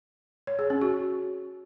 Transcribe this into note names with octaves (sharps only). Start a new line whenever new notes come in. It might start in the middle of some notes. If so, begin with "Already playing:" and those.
C#5
G#4
C#4
F#4